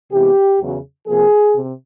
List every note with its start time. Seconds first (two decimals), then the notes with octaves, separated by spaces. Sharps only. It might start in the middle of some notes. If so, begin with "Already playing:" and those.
0.12 C3 E3 G#3 B3 G4
0.60 E2 C#3 F#3
1.07 C3 F3 A#3 G#4
1.55 C3